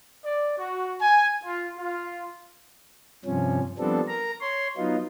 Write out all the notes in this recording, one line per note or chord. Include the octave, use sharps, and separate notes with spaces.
D5
F#4
G#5
F4
F4
G2 C3 F3 C#4
F3 G3 B3 C4 D4 A4
A#4 A#5
C#5 C6
F#3 B3 D#4 F4